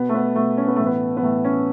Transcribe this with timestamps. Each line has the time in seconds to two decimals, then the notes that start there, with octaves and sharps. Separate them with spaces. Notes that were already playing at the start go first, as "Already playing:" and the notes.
Already playing: B2 B3
0.09 A3
0.15 B3
0.36 B2 A3
0.58 C#4
0.67 B3
0.76 A2 E3 A3
0.86 B3
1.17 B3
1.23 A2 E3 A3
1.45 C#4